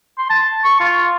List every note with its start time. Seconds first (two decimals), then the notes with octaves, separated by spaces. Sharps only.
0.18 C6
0.30 A5
0.64 C#6
0.80 F4